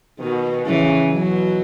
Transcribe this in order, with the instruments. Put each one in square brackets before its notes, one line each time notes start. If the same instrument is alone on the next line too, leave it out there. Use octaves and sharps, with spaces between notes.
[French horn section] B2 [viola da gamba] D#3
[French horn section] C#3 [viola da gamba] E3
[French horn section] B2 [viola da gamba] F#3